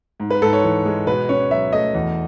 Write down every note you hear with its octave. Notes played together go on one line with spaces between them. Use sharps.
G#2
B4
G#2 A4
C#5
E3
G#3
B2 B4
C#4 C#5
F#3 E5
A3 D#5
E2